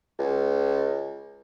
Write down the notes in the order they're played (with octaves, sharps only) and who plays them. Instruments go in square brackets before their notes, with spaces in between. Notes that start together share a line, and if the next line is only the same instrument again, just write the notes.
[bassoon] C#2